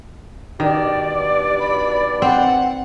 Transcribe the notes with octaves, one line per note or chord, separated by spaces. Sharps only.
G2 B2 D#3 D5
B5
C4 F#5